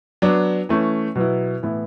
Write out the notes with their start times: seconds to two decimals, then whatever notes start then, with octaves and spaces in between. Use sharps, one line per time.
0.22 F#3 B3 D4
0.69 E3 A3 C#4
1.15 B2 F#3 B3 E4
1.63 A2 E3 B3 E4